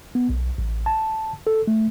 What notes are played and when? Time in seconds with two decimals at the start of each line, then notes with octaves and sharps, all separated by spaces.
0.15 B3
0.29 B1
0.58 A1
0.86 A5
1.47 A4
1.67 A3